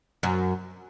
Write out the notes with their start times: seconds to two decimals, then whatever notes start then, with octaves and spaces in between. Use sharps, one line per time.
0.23 F#2